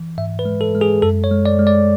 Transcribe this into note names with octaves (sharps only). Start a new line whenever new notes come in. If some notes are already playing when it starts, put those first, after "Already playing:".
Already playing: E3
G#2 E5
B4
G#3
A4
G#3
G#4
F#2 A4
C#5
G#3
D5
G#3
D5